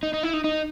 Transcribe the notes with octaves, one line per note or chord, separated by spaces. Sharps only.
D#4
D#4
E4
D#4
D#4